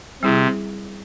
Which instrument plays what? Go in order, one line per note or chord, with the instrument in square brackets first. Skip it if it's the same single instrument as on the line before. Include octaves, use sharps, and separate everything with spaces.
[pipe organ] C3 [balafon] G3 C4 E4 G#4